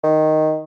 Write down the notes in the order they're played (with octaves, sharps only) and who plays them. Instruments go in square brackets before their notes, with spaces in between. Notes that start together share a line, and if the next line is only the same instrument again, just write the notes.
[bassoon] D#3